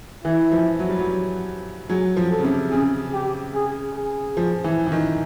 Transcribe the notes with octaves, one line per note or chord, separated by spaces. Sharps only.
E3 E4
F3
F#3
G3
F#3
F#3 G#4
F3
A4
C#3
C3
C#3 G#4
G4
G#4
G#4
F3
E3
E3
D#3